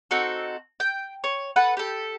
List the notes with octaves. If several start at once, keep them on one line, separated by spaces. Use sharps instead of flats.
C4 D#4 F#4 A4
G5
C#5
A4 B4 F#5
G4 A4